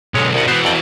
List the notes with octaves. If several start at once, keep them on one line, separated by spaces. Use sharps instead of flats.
B1 D3 G#3 C#5
C2 B2 D#3 F#5
E3 B3 F#4 C5
F2 D5 G5